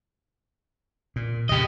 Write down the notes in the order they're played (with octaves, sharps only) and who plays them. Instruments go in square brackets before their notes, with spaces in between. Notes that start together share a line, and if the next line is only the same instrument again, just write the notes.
[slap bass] A#2
[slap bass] F2 C#3 [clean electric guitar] G4 D#5